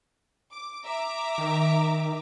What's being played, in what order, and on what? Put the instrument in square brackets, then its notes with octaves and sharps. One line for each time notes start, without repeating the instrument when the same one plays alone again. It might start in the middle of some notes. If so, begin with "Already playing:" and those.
[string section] D6
E5 A#5 D6
[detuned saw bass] D#3